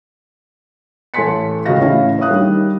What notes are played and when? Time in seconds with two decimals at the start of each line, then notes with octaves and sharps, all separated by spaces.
1.14 A1 A4 G#5 C6 B6 C#7
1.66 C#2 C#3 F#4 D#5 F5 A#6
1.80 A1 A2 C#4 E4 F5
2.18 C#5 E5 F5 D#6 F#6
2.30 D#3 G3